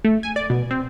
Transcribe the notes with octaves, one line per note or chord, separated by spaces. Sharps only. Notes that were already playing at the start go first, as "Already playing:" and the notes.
A3
G#5
D5
B2
C4